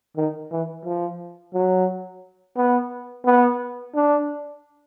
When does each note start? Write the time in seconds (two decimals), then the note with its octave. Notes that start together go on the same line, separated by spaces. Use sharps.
0.17 D#3
0.51 E3
0.85 F3
1.54 F#3
2.56 B3
3.25 B3
3.95 D4